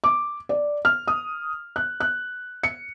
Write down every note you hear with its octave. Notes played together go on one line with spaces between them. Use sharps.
D6
D5
F6
D#6
F#6
F#6
C#7